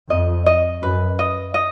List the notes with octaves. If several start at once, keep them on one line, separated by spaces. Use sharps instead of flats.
F2 D#5
D#5
F#2 B4
D#5
D#5